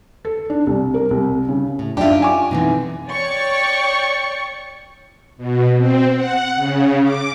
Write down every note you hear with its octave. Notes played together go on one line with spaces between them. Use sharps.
A4
D4
C2
A#4
C2
C#3
A2
F#2 D4 D#4 F4 G4 E5 G5
G#5 D6
B2 D3 E3 B3 C4 D#4
C#5 D5 G5 C#6 A6 C#7
B2
C4
F#5
C#3
D6